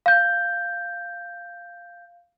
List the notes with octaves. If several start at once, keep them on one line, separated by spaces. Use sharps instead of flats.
F5 G6